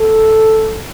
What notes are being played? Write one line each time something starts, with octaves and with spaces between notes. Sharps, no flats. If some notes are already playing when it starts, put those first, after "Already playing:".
Already playing: A4